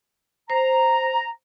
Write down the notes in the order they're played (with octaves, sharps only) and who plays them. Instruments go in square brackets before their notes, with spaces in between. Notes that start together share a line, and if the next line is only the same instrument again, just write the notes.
[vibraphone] C5 [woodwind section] A#5